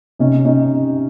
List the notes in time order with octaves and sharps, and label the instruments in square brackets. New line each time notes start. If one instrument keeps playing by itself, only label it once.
[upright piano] C3 C#4 D#4
C#4 D#4